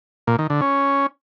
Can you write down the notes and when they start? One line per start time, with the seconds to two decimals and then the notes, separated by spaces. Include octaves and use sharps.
0.27 A#2
0.39 D#3
0.50 D3
0.61 C#4